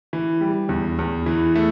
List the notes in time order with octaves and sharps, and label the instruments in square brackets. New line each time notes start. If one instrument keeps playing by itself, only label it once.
[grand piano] E3
G3
E2
E2
E3
A3